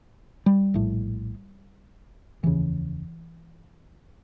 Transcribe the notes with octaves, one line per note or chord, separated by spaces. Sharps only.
G3
A#1 A2
F1 D#2 C#3 E3